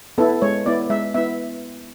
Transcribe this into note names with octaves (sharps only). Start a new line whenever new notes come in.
B3 E4 A4
G#3 C#5
B3 E4 D5
G#3 E5
B3 E4 E5